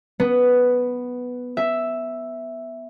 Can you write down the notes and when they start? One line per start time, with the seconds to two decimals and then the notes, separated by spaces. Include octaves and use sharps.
0.20 B3
1.57 E5